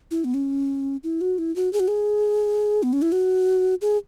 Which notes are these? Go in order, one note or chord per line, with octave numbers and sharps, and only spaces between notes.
E4
B3
C#4
E4
F#4
E4
F#4
G#4
F#4
G#4
B3
C#4
E4
F#4
G#4